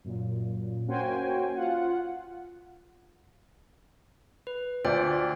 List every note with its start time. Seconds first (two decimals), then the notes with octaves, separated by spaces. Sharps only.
0.04 F#2 A#2
0.87 A#3 C#4 F#4 C5 G5 G#5
1.56 F4 F#5
4.47 B4
4.85 D2 F4 C5 D5 G5